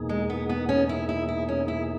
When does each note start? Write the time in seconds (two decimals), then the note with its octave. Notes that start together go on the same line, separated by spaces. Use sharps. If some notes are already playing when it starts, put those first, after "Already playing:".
Already playing: E2 B2 A#3 D#4 G#4
0.09 G#3
0.30 B3
0.49 B3
0.69 C#4
0.89 E4
1.09 E4
1.29 E4
1.49 C#4
1.68 E4